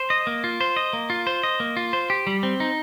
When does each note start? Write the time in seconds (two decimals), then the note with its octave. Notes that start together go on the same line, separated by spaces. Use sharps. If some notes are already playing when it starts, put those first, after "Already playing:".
Already playing: C5
0.10 D#5
0.27 A#3
0.44 F4
0.61 C5
0.77 D#5
0.93 A#3
1.10 F4
1.27 C5
1.43 D#5
1.60 A#3
1.77 F4
1.93 C5
2.10 G4
2.27 G3
2.43 C4
2.60 D#4